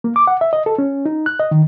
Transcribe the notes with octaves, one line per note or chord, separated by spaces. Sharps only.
A#3
D6
F#5
E5
D#5
A4
C#4
D#4
F#6
D#5
D#3